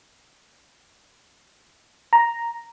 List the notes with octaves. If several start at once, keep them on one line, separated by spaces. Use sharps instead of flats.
A#5